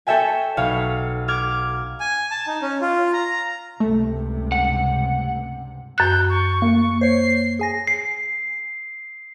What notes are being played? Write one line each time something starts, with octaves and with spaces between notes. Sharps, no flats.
A4 C#5 E5 G5 G#5
B1 C#5 F5
D6 F6 G#6
G#5
A5
D#4
C#4
F4
A#5
C#2 G2 C3 A3
F#5
F#2 F#6 G6
C#6
A#3
C5 C#5 C7
G#4 G#5 A#6
C7